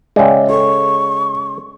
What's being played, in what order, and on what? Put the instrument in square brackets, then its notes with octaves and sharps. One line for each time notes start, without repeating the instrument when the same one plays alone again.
[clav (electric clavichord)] C#3 G#3 [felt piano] D5 E5 G5
[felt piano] A4 [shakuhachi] C#6